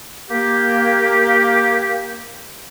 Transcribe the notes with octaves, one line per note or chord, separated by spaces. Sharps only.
A#3 G4